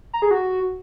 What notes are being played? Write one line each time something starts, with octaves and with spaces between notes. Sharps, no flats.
A#5
G#4
F#4